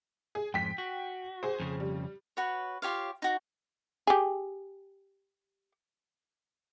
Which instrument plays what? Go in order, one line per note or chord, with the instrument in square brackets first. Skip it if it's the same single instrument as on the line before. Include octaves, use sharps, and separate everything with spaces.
[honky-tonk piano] G#4
[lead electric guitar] F2 G#2 [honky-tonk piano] G5 B6
[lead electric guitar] F#4
[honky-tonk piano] G#4 C5
[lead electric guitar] F2 C#3
[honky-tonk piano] G3
[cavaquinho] F#4 B4 C#5
F4 G4 C#5 F5
D#4 F#4
[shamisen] G4 G#4